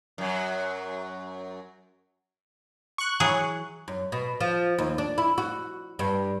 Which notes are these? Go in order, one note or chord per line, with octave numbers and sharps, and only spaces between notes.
F#2 F#3
C#6 F#6
E3 F#3 G#4
F#2
B2
F3
D#2
D4
E4
F#4
G2